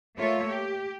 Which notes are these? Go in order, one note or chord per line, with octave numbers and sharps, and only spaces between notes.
A3 A#3 F4 C#5 E5
G4